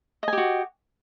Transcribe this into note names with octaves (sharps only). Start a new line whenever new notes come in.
F#4 G4 D#5 G#5